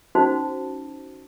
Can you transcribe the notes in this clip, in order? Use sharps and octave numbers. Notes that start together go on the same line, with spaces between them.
C#4 D#4 F#4 C5 A5